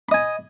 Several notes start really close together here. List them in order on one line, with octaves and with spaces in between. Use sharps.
B5 D#5 G#5